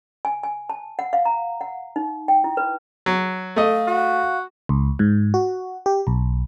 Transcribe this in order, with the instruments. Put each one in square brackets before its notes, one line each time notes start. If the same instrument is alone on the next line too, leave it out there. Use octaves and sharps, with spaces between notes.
[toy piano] G#5
G#5
A5
F#5
F5
A#5
F#5
D#4
G5
E4
B4
[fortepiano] F#3
[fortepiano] A3 D#5 [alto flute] F5
[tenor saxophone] F#4
[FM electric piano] C#2
G#2
F#4
G4
B1